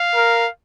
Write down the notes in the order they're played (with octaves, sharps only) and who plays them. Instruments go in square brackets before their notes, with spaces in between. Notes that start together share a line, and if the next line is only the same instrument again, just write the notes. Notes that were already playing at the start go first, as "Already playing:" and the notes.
Already playing: [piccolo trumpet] F5
[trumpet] A#4